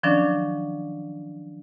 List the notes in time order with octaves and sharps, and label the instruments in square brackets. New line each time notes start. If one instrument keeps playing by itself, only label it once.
[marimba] D#3 F3 F#3 C#4 D4 D5